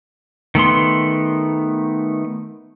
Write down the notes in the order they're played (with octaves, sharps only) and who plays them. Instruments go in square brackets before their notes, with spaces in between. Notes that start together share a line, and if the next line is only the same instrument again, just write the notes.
[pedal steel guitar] D#3 A3 B3 C6